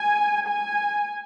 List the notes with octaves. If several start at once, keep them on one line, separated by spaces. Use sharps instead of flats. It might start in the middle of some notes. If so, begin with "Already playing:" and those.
Already playing: G#5
G#5